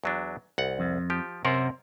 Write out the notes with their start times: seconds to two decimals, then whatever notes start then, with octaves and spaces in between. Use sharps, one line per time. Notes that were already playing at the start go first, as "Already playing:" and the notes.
0.04 E2 F#3 D4
0.58 C2 F#5
0.79 F2
1.10 F3 G4
1.45 F#2 C3 A#4 C5 F#5